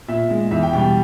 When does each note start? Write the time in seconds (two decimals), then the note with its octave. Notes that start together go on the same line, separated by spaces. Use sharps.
0.08 A#2 E5
0.30 G#3
0.51 E2 E5
0.63 G5
0.73 B2 G3 G5